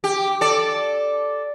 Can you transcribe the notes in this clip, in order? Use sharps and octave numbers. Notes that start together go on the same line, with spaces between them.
G4
A4 D5